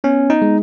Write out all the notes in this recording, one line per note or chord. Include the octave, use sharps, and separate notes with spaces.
B3 C#4
D#4
G#3